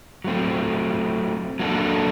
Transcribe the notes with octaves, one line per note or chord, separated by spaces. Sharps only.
F#3 A3 C4
F#3 A#3 D4 A4